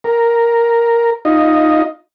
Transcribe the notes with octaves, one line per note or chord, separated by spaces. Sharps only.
A#4
D#4 F4 D#5